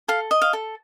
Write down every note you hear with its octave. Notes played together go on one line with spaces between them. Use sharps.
A4 F5
D#5
F5
A4